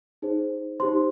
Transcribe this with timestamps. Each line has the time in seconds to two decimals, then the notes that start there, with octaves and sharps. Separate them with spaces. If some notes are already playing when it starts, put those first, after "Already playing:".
0.22 D#4 G#4 C5
0.80 D#4 G4 C5 C6